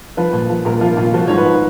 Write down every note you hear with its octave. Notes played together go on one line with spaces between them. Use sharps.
F3 B4
A#2
F3
A#2 A#4
F3 F4
A#2 F4
F3 F#4
G#2 C#5
B4
F3